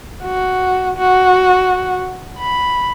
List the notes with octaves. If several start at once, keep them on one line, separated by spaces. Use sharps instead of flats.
F#4
F#4
B5